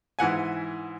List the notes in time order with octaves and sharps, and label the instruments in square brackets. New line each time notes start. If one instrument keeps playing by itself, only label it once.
[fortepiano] G#2 E3 F#5 G#5